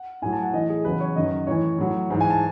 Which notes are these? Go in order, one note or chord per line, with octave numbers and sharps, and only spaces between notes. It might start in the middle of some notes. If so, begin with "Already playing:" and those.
Already playing: F#5
A2 F#3 G#5
A5
F#5
A2 E3 D#5
G#4
E2 C#3 F#3 B4
C#5
F#2 D#3 F#3 D#5
A2 E3 C#5
A2 F#3
G#2 E3
G#5
A5